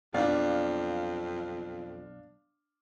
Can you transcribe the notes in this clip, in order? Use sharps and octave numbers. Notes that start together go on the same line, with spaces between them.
B1 F2 B2 D4 D5 F5